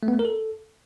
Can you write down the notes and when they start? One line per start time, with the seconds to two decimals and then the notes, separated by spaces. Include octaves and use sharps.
0.03 A3
0.08 B3
0.14 A3
0.19 A#4
0.25 A4